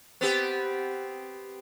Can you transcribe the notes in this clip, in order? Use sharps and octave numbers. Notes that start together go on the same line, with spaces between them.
B3 C4 G4